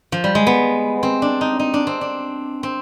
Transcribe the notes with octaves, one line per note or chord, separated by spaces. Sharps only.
F3
G3
G#3
B3
C4
D4
D#4
D#4
D4
C4
D4
C4